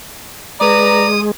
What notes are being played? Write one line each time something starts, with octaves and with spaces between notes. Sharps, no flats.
G#3 B4 D5 A#5 D#6